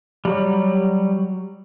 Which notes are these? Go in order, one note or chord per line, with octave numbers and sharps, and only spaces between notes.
F#3 G3